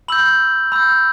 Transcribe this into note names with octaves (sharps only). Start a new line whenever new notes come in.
B5 E6 G6 F#7
B5 E6 G6